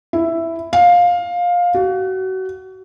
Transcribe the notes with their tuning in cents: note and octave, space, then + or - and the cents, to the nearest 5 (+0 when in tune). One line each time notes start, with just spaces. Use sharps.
E4 +5
F5 +15
F#4 +30